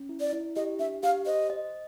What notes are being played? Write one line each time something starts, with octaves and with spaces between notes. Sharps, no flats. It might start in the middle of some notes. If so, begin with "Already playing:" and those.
Already playing: C#4
E4
D5
E4
G4 D#5
D4 E5
G4 F5
C5 D#5
D#5